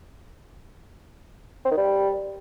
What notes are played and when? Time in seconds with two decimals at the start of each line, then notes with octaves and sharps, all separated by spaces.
1.65 C4
1.71 D#3
1.77 G3